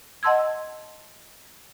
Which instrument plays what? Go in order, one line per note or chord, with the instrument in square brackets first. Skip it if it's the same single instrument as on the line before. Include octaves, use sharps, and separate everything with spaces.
[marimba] D#5 F#5 A5 C6 E6 G#6